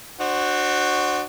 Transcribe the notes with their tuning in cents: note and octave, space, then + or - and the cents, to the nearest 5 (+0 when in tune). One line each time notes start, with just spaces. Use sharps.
D4 +35 F#4 +0 C5 +5